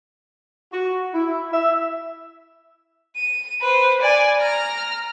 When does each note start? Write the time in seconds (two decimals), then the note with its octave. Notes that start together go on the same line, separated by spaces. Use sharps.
0.72 F#4
1.14 E4
1.52 E5
3.17 D#7
3.62 B4 C5
4.01 D5 G#5
4.40 A#5 F6